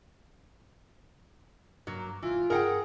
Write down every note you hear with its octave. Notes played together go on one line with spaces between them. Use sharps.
G2 F#3 A#3
E1 E3 F4
G2 G#4 A#4 F#5 G5